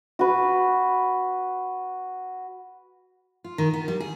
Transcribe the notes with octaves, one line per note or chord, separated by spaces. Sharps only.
F#4 B4
F4
D#3
B3
G3
G#4